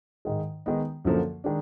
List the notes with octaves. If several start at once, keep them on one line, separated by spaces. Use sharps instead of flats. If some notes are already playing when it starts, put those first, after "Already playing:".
G#2 D#3 G#3
D#3 G#3 B3 D#4
F#2 D3 F3 A#3
D#3 G#3 D4